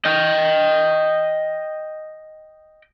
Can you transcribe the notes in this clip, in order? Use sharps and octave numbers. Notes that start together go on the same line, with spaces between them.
D#5 G5